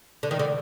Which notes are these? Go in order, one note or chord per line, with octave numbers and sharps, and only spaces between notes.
D3
D#3
D3